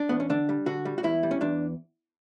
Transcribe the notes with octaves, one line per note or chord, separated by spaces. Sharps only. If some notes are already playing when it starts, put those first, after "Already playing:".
Already playing: D4
E2 B3
C#4
D3 D4
G3
D3 F#4
G3
F#4
E2 E4
G3
C#4
E2 D4